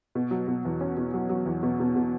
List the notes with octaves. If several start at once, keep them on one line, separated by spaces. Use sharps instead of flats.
B2
F#3
B2
E2
C#4
B2
F#3
F#3
E2
B2
B2
B2